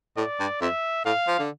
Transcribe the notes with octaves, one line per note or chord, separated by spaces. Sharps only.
A2 D5
G2
F2 E5
A2 F5
F3
D3